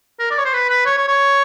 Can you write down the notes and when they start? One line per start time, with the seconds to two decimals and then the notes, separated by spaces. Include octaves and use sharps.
0.19 A#4
0.31 D5
0.38 C#5
0.45 C5
0.53 B4
0.69 B4
0.86 C#5
0.98 C#5
1.08 C#5